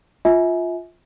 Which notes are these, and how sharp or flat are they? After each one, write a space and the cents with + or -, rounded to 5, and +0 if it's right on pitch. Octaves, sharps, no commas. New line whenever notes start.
F4 +0 E5 -35 G#5 +20